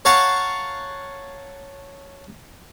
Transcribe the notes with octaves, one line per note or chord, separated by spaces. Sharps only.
C#5 F5 F#5 A5 A#5 C#6